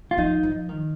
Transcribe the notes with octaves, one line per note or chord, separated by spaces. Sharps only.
F4
F3 D#4
F3
D#3